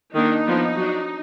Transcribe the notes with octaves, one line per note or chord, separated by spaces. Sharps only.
D#3 A#3 D4 D#4
F3 B3 D4
F#3 D4